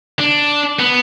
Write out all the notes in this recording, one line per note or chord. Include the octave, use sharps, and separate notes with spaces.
D4
B3